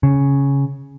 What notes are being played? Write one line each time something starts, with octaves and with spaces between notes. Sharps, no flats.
C#3